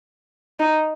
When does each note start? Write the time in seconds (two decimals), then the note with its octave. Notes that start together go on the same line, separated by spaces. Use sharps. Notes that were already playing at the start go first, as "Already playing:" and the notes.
0.60 D#4